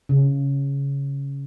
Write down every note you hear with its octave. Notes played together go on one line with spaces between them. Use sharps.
C#3